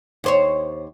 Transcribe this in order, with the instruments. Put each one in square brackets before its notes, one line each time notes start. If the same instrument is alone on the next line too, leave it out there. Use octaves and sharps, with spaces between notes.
[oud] D#2 C5 C#5